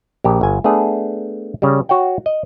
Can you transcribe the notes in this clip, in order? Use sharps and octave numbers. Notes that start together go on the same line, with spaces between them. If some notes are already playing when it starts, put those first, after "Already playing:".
A#1 G4
G1 G#5
A3 B3 D4 G#4
C#3 G3
F#4 C#5 F#5 G5
D#5